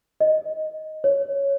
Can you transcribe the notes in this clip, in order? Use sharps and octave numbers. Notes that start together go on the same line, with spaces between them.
D#5
C#5